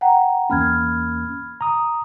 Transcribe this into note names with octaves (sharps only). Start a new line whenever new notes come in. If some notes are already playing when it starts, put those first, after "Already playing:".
F#5 G5 A#5
E2 A#3 C#4 B5 F6 G#6
A#5 D#6